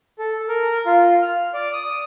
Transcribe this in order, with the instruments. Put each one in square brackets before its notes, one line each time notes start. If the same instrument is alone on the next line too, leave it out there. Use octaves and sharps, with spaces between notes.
[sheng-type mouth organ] A4
A#4
F4
F6
D5
D#6